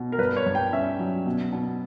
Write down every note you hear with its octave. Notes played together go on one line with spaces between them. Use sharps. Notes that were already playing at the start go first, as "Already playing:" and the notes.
Already playing: B2
A#4
G2 B4
C#5
G2
G5
C#4 E5
F#3
B2
B2